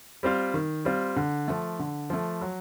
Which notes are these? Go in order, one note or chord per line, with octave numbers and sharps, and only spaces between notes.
G3 C4 F4
D#3
G3 C4 F4
D3
F3 A3
D3
F3 A3
F#3